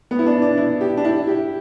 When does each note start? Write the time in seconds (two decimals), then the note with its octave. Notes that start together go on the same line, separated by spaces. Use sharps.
0.11 B3
0.19 E4
0.26 D4
0.42 D4
0.58 E4
0.81 G4
0.97 D4
1.04 E4
1.27 G4